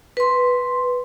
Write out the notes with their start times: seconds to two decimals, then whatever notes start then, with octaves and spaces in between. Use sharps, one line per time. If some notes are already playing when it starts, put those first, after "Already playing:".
0.17 B4 C6